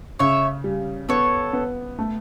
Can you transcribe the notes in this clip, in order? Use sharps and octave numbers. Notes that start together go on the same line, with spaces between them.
C#3 C#5 E5
G3
B3 A4 C#5
B3
A3